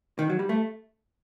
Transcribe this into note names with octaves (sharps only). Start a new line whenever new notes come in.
D#3
F#3
G3
A3